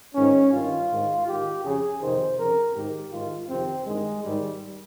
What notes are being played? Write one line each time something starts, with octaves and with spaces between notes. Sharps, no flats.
G#2 D#3 C#4
G2 D#3 F4
G#2 D#3
G#2 D#3 G4
F2 C#3 G#4
F2 C3 D#3 C5
F2 C#3 A#4
G#2 D#3 G4
G#2 D#3 F4
F2 C3 D#3 C4
G2 D#3 G#3
G#2 D#3 G3